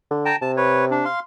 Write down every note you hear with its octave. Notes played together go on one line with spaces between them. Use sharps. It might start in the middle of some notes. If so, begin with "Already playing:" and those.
D3
G5 A5 A#5
C3 A5
B4 C#5
D4
F5 C6